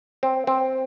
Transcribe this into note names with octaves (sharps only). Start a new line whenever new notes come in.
C4
C4